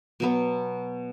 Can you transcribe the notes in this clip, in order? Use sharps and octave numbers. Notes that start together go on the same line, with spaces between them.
B2 F#3 B3